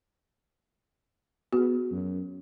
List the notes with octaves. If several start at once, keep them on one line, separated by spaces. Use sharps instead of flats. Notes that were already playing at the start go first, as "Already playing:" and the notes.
B3 F#4 G#4
F#2